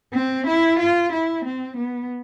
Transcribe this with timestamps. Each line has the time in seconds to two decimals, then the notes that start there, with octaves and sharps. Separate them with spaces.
0.14 C4
0.47 E4
0.79 F4
1.13 E4
1.45 C4
1.77 B3